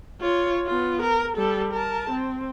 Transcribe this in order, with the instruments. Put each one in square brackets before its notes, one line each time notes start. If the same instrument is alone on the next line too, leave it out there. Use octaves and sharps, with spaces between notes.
[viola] F4 C#5
B3 F4
A#4
G3 A4
A#4 A5
C4